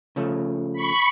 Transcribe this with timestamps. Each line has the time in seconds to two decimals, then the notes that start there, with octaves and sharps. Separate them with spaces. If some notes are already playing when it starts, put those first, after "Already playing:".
0.16 C#3 F3 A3
0.73 B5 C#6